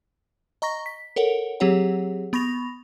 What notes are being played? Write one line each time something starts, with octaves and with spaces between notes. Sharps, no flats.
D#5 A#5 C#6 A#6
B6
A4 A#4 C#5 F#5
F#3 C4 G4 G#4 C#5 F#5
B3 B5 C#6 A#6 F7